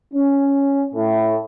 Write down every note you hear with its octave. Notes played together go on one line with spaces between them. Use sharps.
C#4
A2